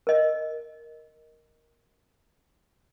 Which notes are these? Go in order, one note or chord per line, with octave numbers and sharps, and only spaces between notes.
A#4 D#5